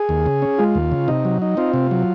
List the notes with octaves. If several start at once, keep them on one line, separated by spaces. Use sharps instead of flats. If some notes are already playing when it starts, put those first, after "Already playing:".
Already playing: G#4
D#2
C#3
C#4
G#3 F4
D#2
C#3
C3 D#4
F#3
D#4
C4 F4
C3
F#3